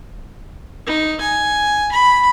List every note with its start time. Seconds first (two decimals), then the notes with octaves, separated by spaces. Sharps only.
0.86 D#4
1.21 G#5
1.92 B5